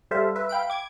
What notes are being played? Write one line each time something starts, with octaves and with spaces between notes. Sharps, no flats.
G3 A4 C5 E5 F5
B4 E5
F5 G5 B5 D7
D6 G#6